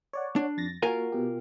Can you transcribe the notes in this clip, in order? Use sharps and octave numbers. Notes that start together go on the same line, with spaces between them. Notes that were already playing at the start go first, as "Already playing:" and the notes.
C#5 D5 F#5
D4
F2 A6 A#6
A#3 F4 F#4 A#4 G#5
B2 G4